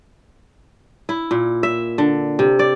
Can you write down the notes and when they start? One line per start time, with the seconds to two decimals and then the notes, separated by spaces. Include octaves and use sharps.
1.09 E4
1.31 A#2
1.63 E5
1.98 D3
2.39 C3
2.59 D5